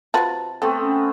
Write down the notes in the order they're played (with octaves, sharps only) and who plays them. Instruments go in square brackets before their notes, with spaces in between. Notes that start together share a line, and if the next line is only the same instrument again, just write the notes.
[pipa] C3 A5 [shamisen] F4 F#4 B4
[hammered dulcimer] A3 B3 C4 [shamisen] A4
[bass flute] C#4